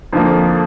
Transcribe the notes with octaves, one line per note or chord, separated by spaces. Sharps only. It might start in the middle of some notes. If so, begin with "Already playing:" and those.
F2 D3 F3 A#3